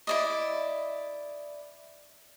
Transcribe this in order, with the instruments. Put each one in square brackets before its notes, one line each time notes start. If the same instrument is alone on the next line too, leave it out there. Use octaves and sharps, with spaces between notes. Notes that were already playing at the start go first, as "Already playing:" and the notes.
[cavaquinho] E4 D5 D#5